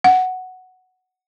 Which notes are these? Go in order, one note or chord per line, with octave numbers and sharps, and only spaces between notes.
F#5